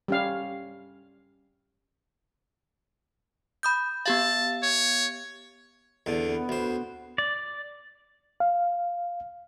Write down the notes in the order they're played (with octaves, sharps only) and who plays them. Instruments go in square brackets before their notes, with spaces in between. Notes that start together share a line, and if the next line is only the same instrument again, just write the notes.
[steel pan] G3 C#4 F5
[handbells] B5 D#6 G6
[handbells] B3 G4 F5 [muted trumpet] A5
[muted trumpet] C#5
[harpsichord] E2 D3
[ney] B3
[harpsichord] D2 C5
[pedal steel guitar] D5
[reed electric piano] F5